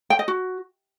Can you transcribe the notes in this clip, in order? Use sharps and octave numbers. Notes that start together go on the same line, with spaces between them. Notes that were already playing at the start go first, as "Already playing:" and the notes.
G5
D#5
F#4